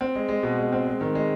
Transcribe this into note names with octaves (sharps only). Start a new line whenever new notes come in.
C4
G#3
G#3
B2
G#3
C4
G#3
D#3
G#3